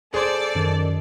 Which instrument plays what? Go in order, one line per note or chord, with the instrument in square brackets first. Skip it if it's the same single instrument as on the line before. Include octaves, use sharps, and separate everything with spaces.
[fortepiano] G#4 C5 [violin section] A4 D5
[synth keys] F#2 D#3